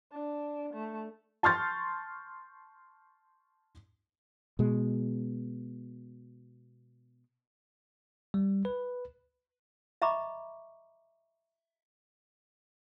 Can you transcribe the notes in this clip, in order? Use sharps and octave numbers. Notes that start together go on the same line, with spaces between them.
D4
A3
A5 C6 C#6 F6 G6 A6
B2 G#3
G3
B4
D#5 E5 A#5 B5 C#6 D6